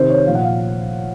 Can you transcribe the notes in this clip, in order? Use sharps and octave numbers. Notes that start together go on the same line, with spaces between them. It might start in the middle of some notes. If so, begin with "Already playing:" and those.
Already playing: C3 D#3 C5
C#5
A#2 F3 F5
F#5
F5